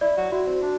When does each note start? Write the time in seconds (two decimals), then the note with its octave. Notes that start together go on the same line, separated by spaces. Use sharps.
0.01 E4 D5
0.17 F#3 F#4
0.32 E4 F#4
0.46 C4
0.61 D4 F#4